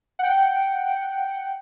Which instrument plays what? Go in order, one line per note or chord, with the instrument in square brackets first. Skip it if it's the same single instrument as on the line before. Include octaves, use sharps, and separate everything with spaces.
[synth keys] F#5 G5